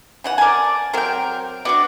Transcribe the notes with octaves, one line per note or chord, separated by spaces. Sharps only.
C#3 E3 F#5
A#4 D5 G#5 A5
F#3 C4 A#4 G5
B3 D4 F#4 D5